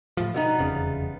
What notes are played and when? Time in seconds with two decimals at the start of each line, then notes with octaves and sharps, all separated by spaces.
0.17 A2 F3
0.34 B2 G3 B3 D#4
0.59 F1 E2 C#3